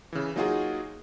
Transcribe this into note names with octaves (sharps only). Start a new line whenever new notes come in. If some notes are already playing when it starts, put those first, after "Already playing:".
C#3 E3
F#3 A#3 D#4 F4 F#4 G#4